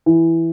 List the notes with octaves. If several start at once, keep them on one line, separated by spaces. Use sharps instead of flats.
E3